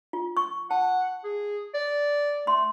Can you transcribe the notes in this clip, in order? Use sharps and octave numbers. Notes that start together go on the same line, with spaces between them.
F4
C#6
F#5 A5
G#4
D5
A3 C6